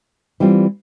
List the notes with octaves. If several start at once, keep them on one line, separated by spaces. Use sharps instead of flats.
E3 G3 C4 F4